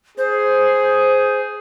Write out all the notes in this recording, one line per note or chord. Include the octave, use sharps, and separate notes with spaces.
G#4 C5